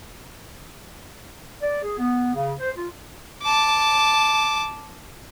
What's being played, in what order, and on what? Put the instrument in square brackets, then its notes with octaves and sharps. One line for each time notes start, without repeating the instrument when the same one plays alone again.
[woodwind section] D5
G#4
B3
C#3
C5
F4
[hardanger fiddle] A5 D6